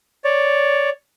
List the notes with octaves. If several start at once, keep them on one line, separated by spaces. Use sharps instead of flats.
C#5 D5